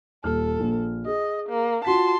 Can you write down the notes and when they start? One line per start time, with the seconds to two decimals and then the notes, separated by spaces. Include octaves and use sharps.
0.24 D#1 A4 F6
0.60 A#1
1.06 G#4 D#5
1.49 A#3
1.85 F4 F#4 A5 C6 B6